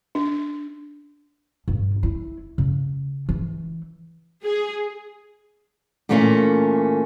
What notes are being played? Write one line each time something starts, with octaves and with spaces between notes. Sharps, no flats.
D4
G2
E4
C#3
E3
G#4
A#2 E3 A3 A#3 C#4